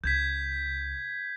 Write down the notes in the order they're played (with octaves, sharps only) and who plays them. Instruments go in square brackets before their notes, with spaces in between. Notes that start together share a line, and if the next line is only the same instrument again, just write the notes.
[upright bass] C#2 [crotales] G6 G#6 B6